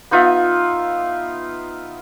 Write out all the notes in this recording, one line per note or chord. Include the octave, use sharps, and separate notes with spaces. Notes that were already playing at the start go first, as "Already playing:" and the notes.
B3 D#4 F4 E5